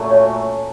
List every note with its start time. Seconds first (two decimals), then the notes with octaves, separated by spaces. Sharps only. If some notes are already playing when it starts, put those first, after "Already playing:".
Already playing: A#2 F#3 A3 C#4
0.10 C#5